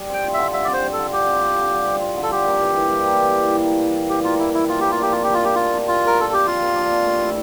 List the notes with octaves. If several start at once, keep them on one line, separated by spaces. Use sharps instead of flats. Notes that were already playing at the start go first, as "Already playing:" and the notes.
Already playing: G3
C4 G5
F4
D3 E5
G3 E5
D5
C4 C5
F4
A4
D3
G3 G4
C4
F4
D3
G3
C4
F4
D3
A4
G3 G4
A#3
E3
E3
G3
A#3
E3
E3
G3
A#3
E3
E3
G3 G4
A#3 F4
E3 E4
E3 E4
F3 F4
A#3 G4
F4
D4 G4
C3 F4
F3 G4
F4
A#3 G4
D4 F4
C3
F3 F4
A#3 A#4
D4 A4
C3 G4
F3 F4
A#3
D4
C3
A3
E4